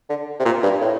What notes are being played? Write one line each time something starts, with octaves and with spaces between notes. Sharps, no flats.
D3
C3
A#2
G2
A2